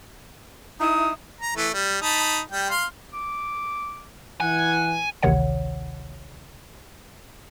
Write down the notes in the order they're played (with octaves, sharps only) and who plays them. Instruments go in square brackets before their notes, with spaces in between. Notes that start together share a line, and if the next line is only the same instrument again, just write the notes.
[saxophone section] D#4 E4 [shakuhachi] D#6
[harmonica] A#5
E3 A3
G3
D#4 A5 B5
G3 G5
F5 C6
[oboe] D6
[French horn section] E3 [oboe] F#5 [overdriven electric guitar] G#5
[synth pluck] A1 D2 C3 D#3 C#5 F#5